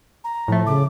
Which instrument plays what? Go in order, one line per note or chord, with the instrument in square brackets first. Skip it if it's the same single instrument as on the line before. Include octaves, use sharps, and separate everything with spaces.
[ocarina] A#5
[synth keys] A2 A3 [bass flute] F3
[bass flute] C#3 [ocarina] D6